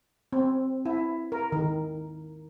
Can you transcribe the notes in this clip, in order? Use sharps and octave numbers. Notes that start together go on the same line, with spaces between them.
C4
E4
A#4
D#3